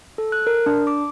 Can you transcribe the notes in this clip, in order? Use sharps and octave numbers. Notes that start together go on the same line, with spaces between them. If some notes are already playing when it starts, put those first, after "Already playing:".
A4
F#6
A#4
D4
D6